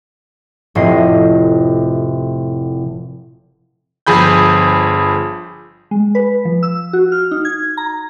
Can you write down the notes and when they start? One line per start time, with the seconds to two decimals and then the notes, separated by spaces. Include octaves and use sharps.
0.75 F1 A2 C3 D#5 C7
4.07 G1 F3 G#4 B5 G6
5.91 G#3
6.15 B4
6.45 F3
6.63 E6
6.93 F#4
7.12 F6
7.31 D#4
7.45 G#6
7.77 A#5